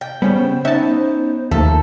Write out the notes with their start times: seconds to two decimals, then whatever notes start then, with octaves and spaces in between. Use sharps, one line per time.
0.01 G5
0.22 C#3 G3 B3 C#4 C5
0.65 B3 C#4 D#4 E5 A5
1.51 D#2 D#3 F3 A3 A4